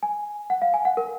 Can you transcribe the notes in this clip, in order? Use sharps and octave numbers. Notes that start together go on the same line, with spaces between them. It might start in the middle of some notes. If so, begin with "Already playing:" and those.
G#5
F#5
F5
G#5
F#5
A#4